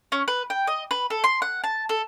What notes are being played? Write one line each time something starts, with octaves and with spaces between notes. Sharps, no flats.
C#4
B4
G5
D#5
B4
A4
C6
F#5
A5
A4